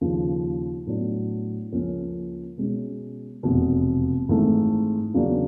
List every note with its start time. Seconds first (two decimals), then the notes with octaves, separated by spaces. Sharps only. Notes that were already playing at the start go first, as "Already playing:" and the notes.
0.01 D#2 C#3 F3
0.87 A2 F#3 B3 D4
1.72 C#2 C#3 F3 A#3 C#4
2.58 B2 G#3 C#4
3.43 F1 E2 B2
4.28 G#1 G#2 E3 A3
5.14 E2 C#3 F#3 A#3 D4